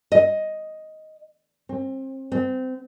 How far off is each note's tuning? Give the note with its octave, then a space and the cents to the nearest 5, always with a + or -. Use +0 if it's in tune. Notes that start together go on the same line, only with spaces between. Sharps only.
D#5 +5
C4 +30
C4 -25